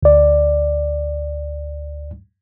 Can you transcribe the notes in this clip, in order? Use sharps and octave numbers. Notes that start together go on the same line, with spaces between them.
D2 D5